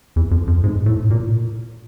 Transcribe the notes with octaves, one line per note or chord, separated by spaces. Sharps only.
E2
F2
F2
G#2
A2
A#2